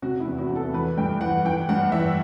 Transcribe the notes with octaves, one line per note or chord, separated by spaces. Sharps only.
C3 F#4
E4
E2
F#4
E2
A4
E3 B4
G2 G5
E3 F#5
E3 G5
G2 F#5
E3 E5